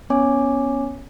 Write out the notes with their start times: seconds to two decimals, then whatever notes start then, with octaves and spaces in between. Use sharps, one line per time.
0.10 B3 C#4 C#5 G#5 D6